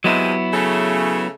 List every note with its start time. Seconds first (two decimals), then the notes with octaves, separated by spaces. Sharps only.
0.04 C3 F#3 G#3 B3 E4
0.52 C#3 A3